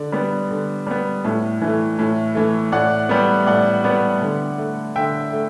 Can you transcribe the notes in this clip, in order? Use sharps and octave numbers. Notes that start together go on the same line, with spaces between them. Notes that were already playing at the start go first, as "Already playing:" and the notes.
Already playing: D3 D5
G3 B3
D3
G3 B3
A2
E3 A3
A2
E3 A3
A2 D5 F#5
G3 B3
A2 D5 F#5
G3 B3
D3
A3
D3 E5 G5
A3